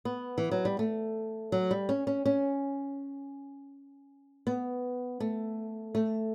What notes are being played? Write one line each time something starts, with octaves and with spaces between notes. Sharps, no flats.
B3
E3
F#3
G3
A3
F#3
G3
C#4
C#4
C#4
B3
A3
A3